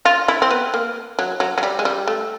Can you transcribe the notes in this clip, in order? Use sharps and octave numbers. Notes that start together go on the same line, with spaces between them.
F4
E4
C4
B3
A#3
F#3
F#3
F#3
G3
G#3
G3
A3